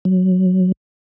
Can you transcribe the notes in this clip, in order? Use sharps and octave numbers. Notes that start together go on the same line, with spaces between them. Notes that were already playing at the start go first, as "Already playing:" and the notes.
F#3